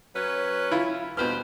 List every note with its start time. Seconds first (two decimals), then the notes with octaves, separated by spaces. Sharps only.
0.15 F#3 C#4 B4
0.71 E4 F4
1.17 G2 B2 G4 B4 C5 F6